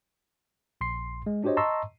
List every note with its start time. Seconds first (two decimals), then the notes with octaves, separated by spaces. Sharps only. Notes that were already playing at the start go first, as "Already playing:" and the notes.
0.81 A#1 C6 C7
1.26 G#3
1.44 D4 F#4 G4 C5 C#5 D#5
1.57 D#5 A5 A#5 C6 C#6 E6